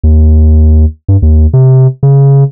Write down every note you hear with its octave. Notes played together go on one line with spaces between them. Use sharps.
D#2
G2
D#2
C3
C#3